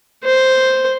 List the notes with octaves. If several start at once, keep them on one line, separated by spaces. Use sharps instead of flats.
C5